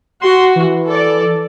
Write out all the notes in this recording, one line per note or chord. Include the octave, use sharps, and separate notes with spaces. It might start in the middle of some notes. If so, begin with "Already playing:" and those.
F#4 C6
E3
A4 D5